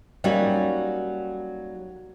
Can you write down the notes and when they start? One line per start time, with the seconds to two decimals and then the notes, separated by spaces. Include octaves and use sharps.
0.24 F#3 G3 A#3 C#4 D#4 F#4